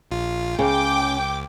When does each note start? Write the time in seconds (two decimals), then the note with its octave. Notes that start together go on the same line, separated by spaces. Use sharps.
0.11 A#1 F4
0.59 C#2 C#3 G5 D6